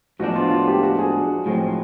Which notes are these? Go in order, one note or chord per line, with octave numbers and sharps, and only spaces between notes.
A2 F3 G#3 B3 D4 F#4
F4
F4
G4
F#4
G#4
A2 F3 G#3 C4